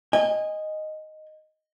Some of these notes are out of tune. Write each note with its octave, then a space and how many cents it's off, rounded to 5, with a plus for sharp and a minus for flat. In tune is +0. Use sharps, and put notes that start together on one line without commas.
D#5 +0 G#5 -25